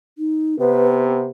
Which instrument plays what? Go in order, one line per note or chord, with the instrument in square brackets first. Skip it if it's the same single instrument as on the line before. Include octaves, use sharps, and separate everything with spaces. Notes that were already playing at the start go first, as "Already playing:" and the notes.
[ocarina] D#4
[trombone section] C3 B3 [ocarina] B4